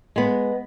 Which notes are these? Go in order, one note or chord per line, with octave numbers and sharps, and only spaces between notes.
G#3 B3